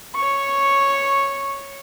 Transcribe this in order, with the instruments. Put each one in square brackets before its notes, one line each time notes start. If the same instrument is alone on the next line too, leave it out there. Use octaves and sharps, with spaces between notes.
[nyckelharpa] C#5 C#6